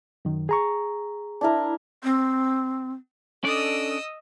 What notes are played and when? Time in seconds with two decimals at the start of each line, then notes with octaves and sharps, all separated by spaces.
0.25 F#2 D#3
0.49 G#4 A#5 C#6
1.41 D4 E4 A#4
2.04 C4
3.44 C#4 D4 A4 D5 D#5 D#6 E6